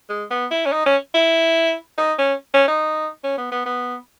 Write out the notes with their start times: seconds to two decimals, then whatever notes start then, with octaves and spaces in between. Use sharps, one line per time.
0.09 G#3
0.31 B3
0.51 E4
0.66 C#4
0.72 D#4
0.86 C#4
1.14 E4
1.98 D#4
2.19 C#4
2.54 C#4
2.68 D#4
3.23 C#4
3.38 B3
3.52 B3
3.66 B3